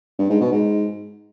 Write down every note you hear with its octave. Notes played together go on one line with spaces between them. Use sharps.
G2
G#2
B2
G#2